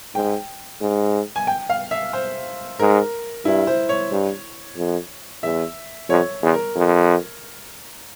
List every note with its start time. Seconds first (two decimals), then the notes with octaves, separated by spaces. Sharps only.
0.15 G#2 G5
0.81 G#2
1.36 G#5
1.47 G5
1.69 F5
1.91 E5
2.13 C5
2.79 G#2 A#4
3.45 G2 E4
3.67 C5
3.89 C#5
4.11 G2
4.77 F2
5.43 E2 E5
6.10 F2 C#5
6.43 E2
6.54 A#4
6.75 F2